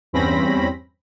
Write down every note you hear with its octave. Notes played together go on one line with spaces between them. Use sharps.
E2 G2 C4 C#4 B5 A#6